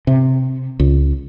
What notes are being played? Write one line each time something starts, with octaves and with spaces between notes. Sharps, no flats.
C3
C#2